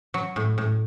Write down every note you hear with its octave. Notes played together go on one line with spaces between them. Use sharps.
F#3
A2
A2